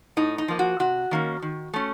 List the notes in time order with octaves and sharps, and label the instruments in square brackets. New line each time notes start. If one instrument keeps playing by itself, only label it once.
[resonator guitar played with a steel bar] A2 D#4
D#4
F3 A#3
F#4
C3 F#4
D#3 A#3 C#4
D#3
A3 C#4